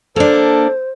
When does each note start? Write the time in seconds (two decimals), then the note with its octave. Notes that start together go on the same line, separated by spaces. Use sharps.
0.16 A#3 D4 A4 C5